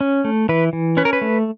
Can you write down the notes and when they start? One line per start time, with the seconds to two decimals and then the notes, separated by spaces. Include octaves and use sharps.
0.01 C#4
0.25 A3
0.49 E3 B4
0.73 E3
0.97 C#4 B4
1.05 A#4
1.13 B4
1.21 A3